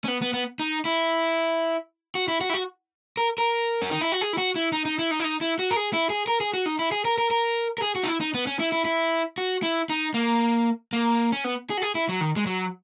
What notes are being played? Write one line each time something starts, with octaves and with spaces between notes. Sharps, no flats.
C#4
B3
B3
B3
D#4
E4
F#4
E4
F#4
E4
F#4
A#4
A#4
C#4
D#4
E4
F#4
G#4
E4
F#4
E4
D#4
D#4
E4
D#4
E4
D#4
E4
F#4
A#4
G#4
E4
G#4
A#4
G#4
F#4
D#4
E4
G#4
A#4
A#4
A#4
A#4
G#4
F#4
D#4
E4
D#4
B3
C#4
E4
E4
E4
F#4
E4
D#4
A#3
A#3
C#4
B3
G#4
F#4
G#4
E4
F#3
D#3
G#3
F#3